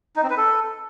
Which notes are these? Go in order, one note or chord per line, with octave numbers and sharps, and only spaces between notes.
D#4
C4
B4
A4